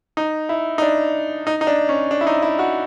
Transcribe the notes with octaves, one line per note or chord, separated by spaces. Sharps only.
D#4
E4
D#4
D4
D#4
D#4
D4
C#4
D4
E4
D#4
E4
F#4